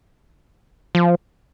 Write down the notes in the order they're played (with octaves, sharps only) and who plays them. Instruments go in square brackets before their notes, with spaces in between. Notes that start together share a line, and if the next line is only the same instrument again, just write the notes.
[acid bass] F3